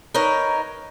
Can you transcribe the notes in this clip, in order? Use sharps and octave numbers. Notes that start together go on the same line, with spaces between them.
D#4 A#4 B4 C#5